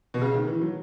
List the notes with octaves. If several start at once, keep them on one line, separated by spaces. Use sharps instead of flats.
B2
C#3
D#3
E3
F#3